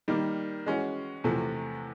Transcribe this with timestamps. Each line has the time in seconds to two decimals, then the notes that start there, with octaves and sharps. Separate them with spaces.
0.08 D#3 G3 A#3
0.66 E3 G#3 C#4 F#4
1.24 E2 C3 F3 A3